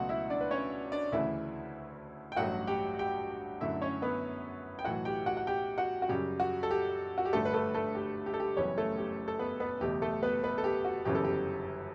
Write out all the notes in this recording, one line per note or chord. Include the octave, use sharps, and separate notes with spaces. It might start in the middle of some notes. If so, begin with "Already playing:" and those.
Already playing: C#2 B2 F#3 A3 F#4 F#5
E4 E5
D4 D5
B4
C#4 C#5
D4 D5
D2 C#3 E3 A3 E4 E5
G5
A1 G2 F#3 A3 F#4 F#5
G4 G5
G4 G5
F#2 D3 A3 E4 E5
C#4 C#5
B3 B4
G5
B1 A2 E3 F#4 F#5
G4 G5
F#4 F#5
F#5
G4 G5
F#4 F#5
F#4
F#2 C#3 G3 G4
F#4
A4
G4
F#4
G4
G1 G2 D3 A3 A4
B4
A3 A4
A3 A4
G4
G4
A4
G4
F#1 F#2 E3 G3 B3 C#4 C#5
A3 A4
G4
A4
B3 B4
B3 B4
F#1 E2 B2 A3 G4
A3 A4
B3 B4
B3 B4
A4
G4
F#4
G1 F#2 C#3 E3 B3 G4
A4
G4